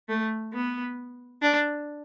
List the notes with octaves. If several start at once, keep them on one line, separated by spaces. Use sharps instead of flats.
A3
B3
D4